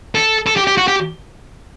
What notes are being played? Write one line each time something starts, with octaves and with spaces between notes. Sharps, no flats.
A4
A4
G4
G4
F#4
G4